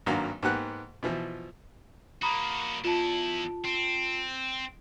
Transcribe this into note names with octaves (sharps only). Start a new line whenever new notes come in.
G#1 G2 F#3 A#3 F#4 F5
G#2 A#3 B3 G4 F#5 F#6
B2 E3 F3
A#3 F#4 A#5 B5 D#6
E2 E4 F4 A5
C4